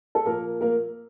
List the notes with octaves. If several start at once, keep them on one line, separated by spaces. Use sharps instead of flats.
A4
A#2 F3 A#3 A#4
A#3 A#4